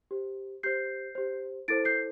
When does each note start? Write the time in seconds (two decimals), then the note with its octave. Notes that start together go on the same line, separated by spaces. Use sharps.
0.11 G4 C5
0.63 G4 C5 G6 C7
1.15 G4 C5
1.68 E4 A4 C5 A6 D7
1.85 G6 C7